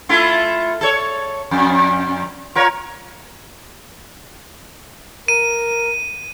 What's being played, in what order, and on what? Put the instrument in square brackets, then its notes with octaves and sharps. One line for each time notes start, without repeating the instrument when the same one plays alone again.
[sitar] A3 E4 F4
A4 C#5
F2
F4 A#4 C#5
[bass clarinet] A#4 [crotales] D#7